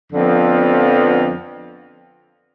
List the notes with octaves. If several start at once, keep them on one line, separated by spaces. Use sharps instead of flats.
F2 D3 F3 B3